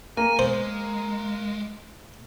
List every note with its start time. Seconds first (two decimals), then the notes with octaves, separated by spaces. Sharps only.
0.17 A#3 G#5
0.39 G#3 C5